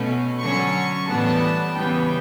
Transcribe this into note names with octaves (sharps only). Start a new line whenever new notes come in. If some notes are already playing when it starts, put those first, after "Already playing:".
Already playing: B2 A3 C#4
D3 F#3 C#4 C#6
A2 E3 G3 B3 D4 A5
C#3 E3 G3 B3 G5